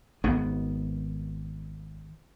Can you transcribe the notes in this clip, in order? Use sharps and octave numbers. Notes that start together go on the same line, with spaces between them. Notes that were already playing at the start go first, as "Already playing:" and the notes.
G#1 B3